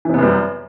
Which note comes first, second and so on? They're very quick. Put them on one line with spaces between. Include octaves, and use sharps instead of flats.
E3 C3 B3 F#2 G3